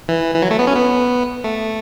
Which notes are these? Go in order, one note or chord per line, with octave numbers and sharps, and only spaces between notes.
E3
E3
F#3
A3
B3
C#4
B3
A3